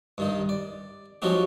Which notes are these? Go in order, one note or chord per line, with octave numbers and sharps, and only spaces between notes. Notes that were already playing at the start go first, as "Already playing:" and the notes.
G2 D#3 D#4
D5
F3 F#3 C#4 D#4 F#4 G4